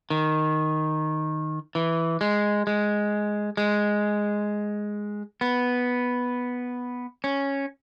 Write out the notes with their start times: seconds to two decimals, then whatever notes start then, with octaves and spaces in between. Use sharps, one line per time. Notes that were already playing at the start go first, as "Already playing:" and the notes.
0.10 D#3
1.75 E3
2.21 G#3
2.67 G#3
3.57 G#3
5.41 B3
7.24 C#4